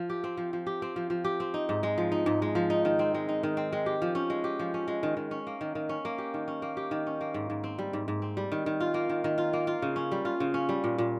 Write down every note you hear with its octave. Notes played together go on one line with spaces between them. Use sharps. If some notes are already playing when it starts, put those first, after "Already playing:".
Already playing: F3
G4
C4
F3
F3
G4
C4
F3
F3
G4
C4
D#4
G#2
G#3
F3
D#4
G#2
G#3
F3
D#4
D#3
C4
G#3
D#4
D#3
C4
G#3
G4
F3
C#4
G#3
G4
F3
C#4
G#3
D#3
D#3
C#4
A#3
D#3
D#3
C#4
A#3
G4
D#3
C#4
A#3
G4
D#3
C#4
A#3
G#2
G#2
C4
G3
G#2
G#2
C4
G3
D#3
D#3
F4
A#3
D#3
D#3
F4
A#3
F4
C#3
C#4
G3
F4
C#3
C#4
G3
A#2
A#2